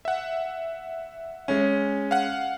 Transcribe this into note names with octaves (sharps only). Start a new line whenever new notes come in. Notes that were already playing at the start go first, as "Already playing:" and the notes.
E5 F#5
G#3 C#4
F5 F#5